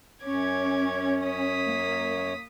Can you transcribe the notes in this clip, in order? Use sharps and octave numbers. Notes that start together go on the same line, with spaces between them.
F#2 C#4 C#5 D6 G#6
D#6 B6
A#3